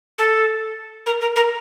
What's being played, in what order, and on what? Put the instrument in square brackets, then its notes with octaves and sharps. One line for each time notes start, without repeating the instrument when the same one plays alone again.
[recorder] A4
A#4
A#4
A#4